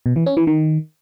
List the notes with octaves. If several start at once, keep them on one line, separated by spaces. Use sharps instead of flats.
B2
E3
C#4
E3
D#3